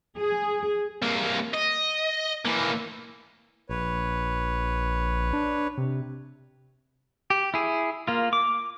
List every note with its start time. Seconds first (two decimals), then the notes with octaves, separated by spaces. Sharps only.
0.17 G#4
1.02 C2 A#3
1.54 D#5
2.45 E3 A#3
3.69 A#1 B4 C#5
5.33 D4
5.78 C3
7.30 G4
7.54 E4 G#4
8.08 A#3 F4
8.33 D6